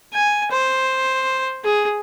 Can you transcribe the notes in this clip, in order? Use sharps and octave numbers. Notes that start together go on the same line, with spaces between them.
G#5
C5
G#4